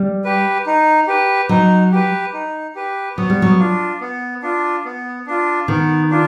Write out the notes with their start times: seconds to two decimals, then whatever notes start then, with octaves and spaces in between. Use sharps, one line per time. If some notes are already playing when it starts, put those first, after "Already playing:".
Already playing: G3
0.24 G4 B4
0.66 D#4
1.08 G4 B4
1.49 F#3 D#4
1.92 G4 B4
2.33 D#4
2.75 G4 B4
3.17 F#3 B3
3.30 G3
3.42 F#3
3.59 D4 F4
4.01 B3
4.42 D4 F4
4.85 B3
5.27 D4 F4
5.68 D#3 B3
6.11 D4 F4